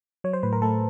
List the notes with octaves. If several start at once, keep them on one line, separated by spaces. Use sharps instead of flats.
F#3 C#5
C5
A2 B4
A#4
A3 A4